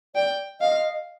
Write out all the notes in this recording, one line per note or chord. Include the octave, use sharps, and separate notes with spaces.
D5 G5
D#5 F5